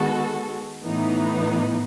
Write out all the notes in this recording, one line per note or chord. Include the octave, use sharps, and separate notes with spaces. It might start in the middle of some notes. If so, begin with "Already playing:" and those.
Already playing: D#3 G#3 B3 F#4 A4
A2 E3 B3 D#4